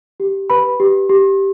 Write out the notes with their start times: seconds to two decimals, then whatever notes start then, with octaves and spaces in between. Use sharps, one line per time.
0.20 G4
0.50 B4 B5
0.80 G4
1.09 G4